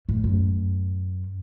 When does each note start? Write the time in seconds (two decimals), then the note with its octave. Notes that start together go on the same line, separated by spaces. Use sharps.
0.09 A2
0.24 F#2